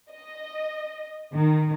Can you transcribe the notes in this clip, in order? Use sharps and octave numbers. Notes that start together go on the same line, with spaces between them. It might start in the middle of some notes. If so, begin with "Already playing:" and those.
D#5
D#3